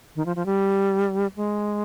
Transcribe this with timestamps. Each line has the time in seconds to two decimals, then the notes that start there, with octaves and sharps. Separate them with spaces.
0.16 D#3
0.26 F3
0.36 F3
0.46 G3
1.36 G#3